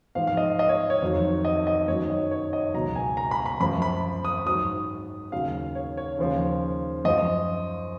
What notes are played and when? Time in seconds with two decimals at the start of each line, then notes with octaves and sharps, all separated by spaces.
0.15 G#2 F3 F5
0.27 F5
0.37 D#5
0.59 D#5
0.69 C#5
0.90 C#5
1.02 F2 D#3 F#3
1.45 D#5
1.67 D#5
1.88 F#2 D#3 F#3 C#5
2.10 D#5
2.31 C#5
2.53 D#5
2.74 C#2 B2 F#3 A#5
2.95 G#5
3.17 A#5
3.31 B5
3.46 B5
3.60 F#2 F3 B5
3.82 B5
4.25 D#6
4.46 G#2 F#3 D#6
5.32 D#2 C#3 F#3 F5
5.75 C#5
5.97 C#5
6.18 D#2 C#3 F3
7.05 F#2 F3 D#5